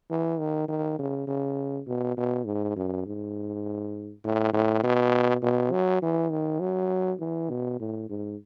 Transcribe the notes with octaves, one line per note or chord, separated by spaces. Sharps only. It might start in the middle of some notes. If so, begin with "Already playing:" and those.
E3
D#3
D#3
C#3
C#3
B2
B2
G#2
F#2
G#2
A2
A2
B2
B2
F#3
E3
D#3
F#3
E3
B2
A2
G#2